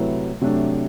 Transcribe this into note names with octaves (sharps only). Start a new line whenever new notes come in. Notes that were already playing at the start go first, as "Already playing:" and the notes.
Already playing: C3 F#3 A3 E4 B4
C3 F#3 A3 D4